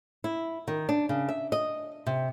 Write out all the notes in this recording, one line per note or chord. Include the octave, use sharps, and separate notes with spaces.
E4
D#3
D4
C#3
E5
D#5
C3